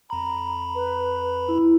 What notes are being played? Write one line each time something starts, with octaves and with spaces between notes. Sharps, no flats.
F2 A#5 B5
B4 A#5
E4